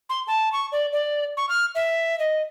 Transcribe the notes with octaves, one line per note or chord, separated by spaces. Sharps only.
C6
A5
C#6
D5
D5
C#6
F6
E5
D#5